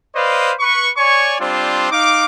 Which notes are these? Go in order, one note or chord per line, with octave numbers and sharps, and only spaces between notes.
B4 C5 D5 D#5 F5
B4 C#6
C#5 D5 G#5 C#6
G3 C4 D4 F4 C5
D#4 F5 D6